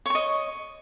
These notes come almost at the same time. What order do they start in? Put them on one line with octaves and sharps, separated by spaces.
C#5 C#6 D#5